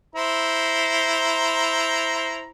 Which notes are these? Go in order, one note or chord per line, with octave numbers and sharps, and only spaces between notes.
E4 C5 A#5